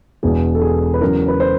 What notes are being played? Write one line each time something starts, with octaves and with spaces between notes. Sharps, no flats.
E1 E2 B2 G#4
A4
G#4
B4
E2 C#3 F#3 A#4
B4
C5